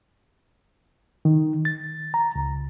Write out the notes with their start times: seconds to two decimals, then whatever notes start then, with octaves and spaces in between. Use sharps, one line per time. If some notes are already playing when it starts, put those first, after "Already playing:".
1.25 D#3
1.65 A6
2.14 A#5
2.36 C#2